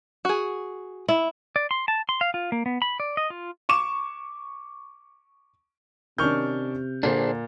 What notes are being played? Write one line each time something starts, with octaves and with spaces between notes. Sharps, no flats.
F#4 G#4
E4
D5
C6
A5
C6
F5
F4
A#3
B3
B5
D5
D#5
F4
C#6 D6 E7
C3 D#3 C#4 D4 C#6 F6 G6
A#2 D3 D4 G#4 C5